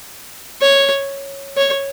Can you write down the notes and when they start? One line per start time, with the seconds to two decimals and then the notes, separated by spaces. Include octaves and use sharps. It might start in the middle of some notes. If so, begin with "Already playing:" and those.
0.62 C#5
1.58 C#5